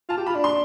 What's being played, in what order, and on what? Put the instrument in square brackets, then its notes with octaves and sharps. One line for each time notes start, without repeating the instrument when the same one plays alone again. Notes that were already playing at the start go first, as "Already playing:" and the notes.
[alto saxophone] F4 [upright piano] A5
[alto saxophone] G4
[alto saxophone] F4 [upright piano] B5
[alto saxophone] D4
[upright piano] C6